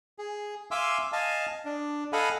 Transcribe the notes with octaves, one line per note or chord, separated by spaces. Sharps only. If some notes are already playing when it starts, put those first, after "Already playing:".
G#4
E5 F5 G#5 C6 D6 E6
D#5 F5 G#5 A5
D4
A4 D#5 F5 F#5 G#5 B5